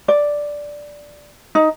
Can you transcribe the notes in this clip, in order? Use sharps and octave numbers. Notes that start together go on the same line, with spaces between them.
D5
D#4